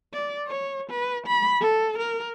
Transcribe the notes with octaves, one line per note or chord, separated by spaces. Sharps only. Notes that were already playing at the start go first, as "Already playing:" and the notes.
D5
C#5
B4
B5
A4
A#4